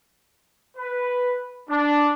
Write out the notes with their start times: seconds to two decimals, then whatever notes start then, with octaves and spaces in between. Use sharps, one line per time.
0.77 B4
1.70 D4